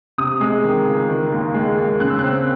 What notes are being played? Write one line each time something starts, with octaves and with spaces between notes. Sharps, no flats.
C3 D#6
G#3
D#3
C#2
D#3
D#2
G#3
D#2
C#3 F#6
E6
C4 F#6